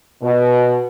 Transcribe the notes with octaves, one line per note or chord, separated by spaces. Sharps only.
B2